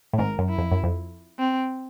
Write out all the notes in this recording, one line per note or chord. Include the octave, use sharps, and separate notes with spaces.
A2
G#1 G#2 A#4
F#2
E4
F2
F#2
F2
C4